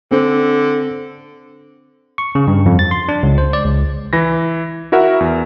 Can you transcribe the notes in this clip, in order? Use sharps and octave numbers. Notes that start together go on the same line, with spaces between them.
D3 C4
C#6
C#3
G2
F2
A6
C6
D4
C#2
C5
D5
C#2
E3 B5 A#6
E4 F#4 A#4 E5 F#5
E2